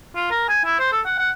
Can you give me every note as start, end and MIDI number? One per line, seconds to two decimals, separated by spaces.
0.16 0.27 65
0.31 0.46 70
0.49 0.62 80
0.65 0.77 64
0.79 0.91 72
0.92 1.00 69
1.05 1.15 78
1.18 1.31 78